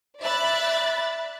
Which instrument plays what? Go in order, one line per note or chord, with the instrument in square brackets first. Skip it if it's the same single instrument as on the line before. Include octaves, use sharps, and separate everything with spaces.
[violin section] D5 E5 B5 F#6 A6